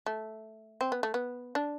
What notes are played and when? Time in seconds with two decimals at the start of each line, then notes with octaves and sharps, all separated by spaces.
0.06 A3
0.81 C4
0.92 B3
1.03 A3
1.14 B3
1.55 D4